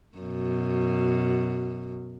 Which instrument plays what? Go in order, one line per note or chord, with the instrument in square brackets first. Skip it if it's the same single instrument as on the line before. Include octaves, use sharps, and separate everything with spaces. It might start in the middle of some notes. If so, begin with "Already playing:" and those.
[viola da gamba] F#2 B2